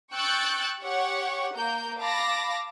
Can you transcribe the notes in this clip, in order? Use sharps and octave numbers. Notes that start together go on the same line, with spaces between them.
G5 C#6 E6 F#6 G6 A6
G4 C#5 F#5 C#6
A#3 A#4 G6
F5 A5 B5 D6 A#6